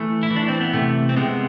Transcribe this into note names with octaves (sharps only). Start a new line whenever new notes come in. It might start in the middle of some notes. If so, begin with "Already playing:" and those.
Already playing: E3 A3
E4
E3
D4
C4
B3
C3 A3
C4
C3 G#3 B3